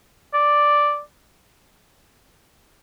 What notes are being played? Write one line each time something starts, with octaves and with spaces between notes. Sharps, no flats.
D5